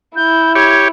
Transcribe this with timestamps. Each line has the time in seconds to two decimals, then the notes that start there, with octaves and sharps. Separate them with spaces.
0.16 E4 G6
0.55 G4 C#5 G#6